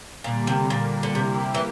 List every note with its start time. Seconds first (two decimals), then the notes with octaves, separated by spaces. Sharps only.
0.24 A#2 D3 G3 A#3
0.47 C3
0.70 A#2
1.03 D3
1.15 C3 A#3 E4 G4
1.54 E3